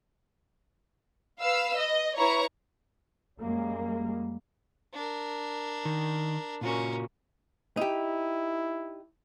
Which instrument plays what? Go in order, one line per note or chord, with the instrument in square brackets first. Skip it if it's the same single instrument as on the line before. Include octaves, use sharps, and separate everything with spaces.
[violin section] B4 F5 E6
D#5
E4 B4 C#5 A#5 C#6
[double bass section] F#2 G3 G#3 A#3
[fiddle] D4 A#4
[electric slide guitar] D#3
[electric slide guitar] A#2 F4 F#4 [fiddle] C#4 A#4
[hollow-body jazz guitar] D#4 G4 [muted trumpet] E4